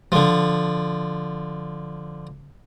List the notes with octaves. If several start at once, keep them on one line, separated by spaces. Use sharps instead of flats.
D3 F3